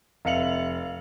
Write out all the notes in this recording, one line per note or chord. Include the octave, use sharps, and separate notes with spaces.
F1 E5 F5 C#7 F7 F#7